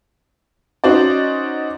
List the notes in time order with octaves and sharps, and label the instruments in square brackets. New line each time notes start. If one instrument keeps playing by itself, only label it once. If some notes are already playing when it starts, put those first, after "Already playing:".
[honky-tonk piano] C#4 D#4 F#4 C5 D5